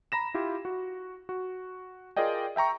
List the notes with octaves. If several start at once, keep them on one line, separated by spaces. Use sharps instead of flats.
A#5 B5 A#6 E7
E4 F4 G4
F#4
F#4
F4 G#4 A#4 D5 D#5 G5
E5 G5 A#5 C#6